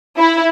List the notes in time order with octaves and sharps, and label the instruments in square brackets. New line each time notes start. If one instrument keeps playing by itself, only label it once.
[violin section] E4